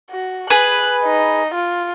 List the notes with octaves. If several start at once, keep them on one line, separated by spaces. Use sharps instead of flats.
F#4
G#4 B4 F#6
D#4
F4